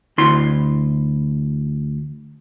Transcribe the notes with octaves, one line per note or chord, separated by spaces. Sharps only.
D2 E4 C6